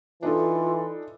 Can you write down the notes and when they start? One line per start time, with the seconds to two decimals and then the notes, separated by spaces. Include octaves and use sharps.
0.23 E3 D4 D#4 F4 A4